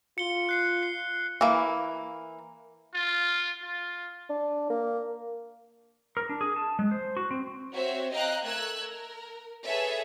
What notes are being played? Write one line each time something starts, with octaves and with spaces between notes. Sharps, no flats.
F4 C#7 G7
F#6 C7 C#7
C7
E3 A#3
F4
F4
D4
A#3
A#4
D4
G#4
A5
G#3
C5
F#4
C4
C4 F#4 C#5 E5
D#5 F5 G5 A#5 F#6
A3 A#4 E6 F#6 G#6
A#4
G#4 A4 B4 C#5 E5